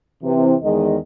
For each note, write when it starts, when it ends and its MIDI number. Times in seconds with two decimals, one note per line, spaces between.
0.23 0.54 48
0.23 0.54 52
0.63 0.96 40
0.63 0.96 51
0.63 0.96 56
0.63 0.96 75